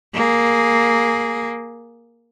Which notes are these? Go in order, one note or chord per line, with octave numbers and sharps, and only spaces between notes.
A#3 G#4